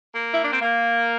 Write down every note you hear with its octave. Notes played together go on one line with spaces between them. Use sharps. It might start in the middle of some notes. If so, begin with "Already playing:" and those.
A#3
E4
D4
C4
A#3